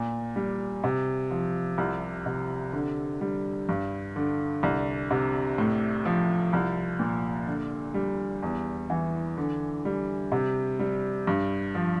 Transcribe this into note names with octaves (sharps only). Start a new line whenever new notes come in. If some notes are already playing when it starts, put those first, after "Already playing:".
Already playing: A#2
G3
C3
F3
C2
C3
D3
G3
G2
D3
C2
C3
A2
F3
C2
A#2
D3
G3
E2
E3
D3
G3
C3
G3
G2
F3